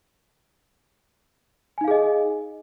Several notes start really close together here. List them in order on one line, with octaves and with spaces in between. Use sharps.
G#5 D#4 F5 G#4 D#5